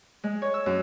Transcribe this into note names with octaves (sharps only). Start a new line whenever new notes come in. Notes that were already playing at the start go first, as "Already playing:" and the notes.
G#3
C#5
E6
F#2